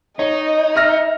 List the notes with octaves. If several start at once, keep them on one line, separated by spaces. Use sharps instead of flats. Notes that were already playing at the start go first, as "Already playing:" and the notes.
D#4 C#5 D#5
E5 F6 A#6